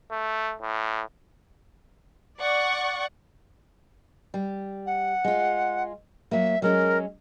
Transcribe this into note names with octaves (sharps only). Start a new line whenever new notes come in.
A3
A2
D5 F#5 C#6
G3
F#5
G#3 F4
F#3 A#3 E5
F#3 G#3 C#4 A#4